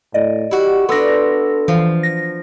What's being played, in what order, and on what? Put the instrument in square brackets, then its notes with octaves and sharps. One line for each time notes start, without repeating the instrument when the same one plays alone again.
[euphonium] A2 [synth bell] D5 D#5
[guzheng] E4 F#4 [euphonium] G4
[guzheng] B3 D4 [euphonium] A4 [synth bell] C6 E6 A#6
[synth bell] E3 F5 [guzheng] F3
[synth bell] A#6